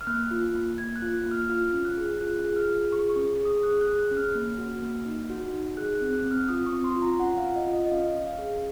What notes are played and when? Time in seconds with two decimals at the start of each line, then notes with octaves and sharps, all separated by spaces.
0.01 F6
0.07 A#3 F#6
0.31 F4
0.54 A#3
0.78 A#3 G#6
0.96 F#6
1.02 F4
1.26 A#3
1.31 F6
1.49 F4 F6
1.73 C#4
1.85 F#6
1.97 G#4
2.21 F4 F#6
2.45 G#4
2.56 F6
2.68 F4
2.92 G#4 C#6
3.09 C#6
3.16 C#4
3.28 C#6
3.40 G#4
3.45 D#6
3.63 G#4 F#6
3.81 F#6
3.87 G#4
3.99 F#6
4.11 C#4
4.17 F6
4.35 A#3
4.58 F#4
4.82 A#3
5.06 D#4
5.30 F#4
5.53 D#4
5.77 G#4 F#6
5.95 F#6
6.01 C4
6.13 F#6
6.25 C4
6.31 F6
6.48 F4 D#6
6.66 C#6
6.72 C4
6.84 C6
6.96 F4
7.02 A#5
7.20 C#4 F#5
7.38 F5
7.44 F4
7.56 D#5
7.67 F4
7.73 D#5
7.86 D#5
7.91 C#4 F5
8.15 C#4
8.27 F5
8.38 G#4